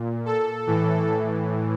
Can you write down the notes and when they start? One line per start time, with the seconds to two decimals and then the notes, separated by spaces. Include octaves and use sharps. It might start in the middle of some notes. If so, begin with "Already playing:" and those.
Already playing: A#2
0.26 A4
0.67 A2 E3